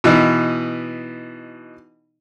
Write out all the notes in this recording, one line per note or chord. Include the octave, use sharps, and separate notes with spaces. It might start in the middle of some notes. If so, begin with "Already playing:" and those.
B2 E3 D#4